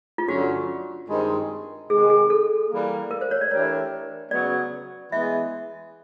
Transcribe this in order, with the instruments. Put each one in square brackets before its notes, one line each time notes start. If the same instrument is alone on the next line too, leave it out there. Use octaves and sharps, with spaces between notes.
[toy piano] F4
[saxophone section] G2 D3 F#3 A3 C#4 [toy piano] F#4
[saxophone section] G2 D#3 G#3 C4 D#4
[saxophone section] C3 D#3 G#3 [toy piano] G#4
[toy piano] G#4
A4
[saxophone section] E3 G3 A#3
[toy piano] A#4
C5
C#5
D5
[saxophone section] E3 A3 D4 G4 A#4 [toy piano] C#5
[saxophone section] C#3 F#3 B3 [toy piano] D5
[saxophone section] E3 G#3 B3 [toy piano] E5